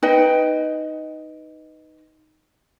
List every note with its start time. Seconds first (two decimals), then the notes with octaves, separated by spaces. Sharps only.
0.03 D#4 B4 D#5 G5